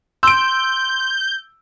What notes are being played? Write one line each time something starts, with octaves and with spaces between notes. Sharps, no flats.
C6 E6 G6 D7